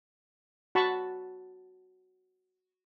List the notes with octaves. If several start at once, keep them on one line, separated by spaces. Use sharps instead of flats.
F#4 A5 B5 C#6